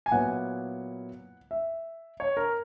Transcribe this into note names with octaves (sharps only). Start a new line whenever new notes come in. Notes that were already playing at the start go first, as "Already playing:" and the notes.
G#5
A#2 F#3 B3 E4 F#5
E5
C#5
A#4